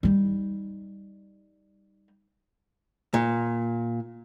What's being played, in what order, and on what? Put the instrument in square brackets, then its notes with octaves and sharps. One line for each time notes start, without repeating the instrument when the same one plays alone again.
[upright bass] G3 D#4
[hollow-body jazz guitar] A#2